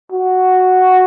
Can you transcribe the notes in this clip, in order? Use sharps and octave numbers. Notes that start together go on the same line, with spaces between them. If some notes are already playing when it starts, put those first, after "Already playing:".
F#4